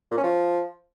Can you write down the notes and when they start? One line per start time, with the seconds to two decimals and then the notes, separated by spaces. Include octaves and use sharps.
0.11 A#2
0.17 C#4
0.24 F3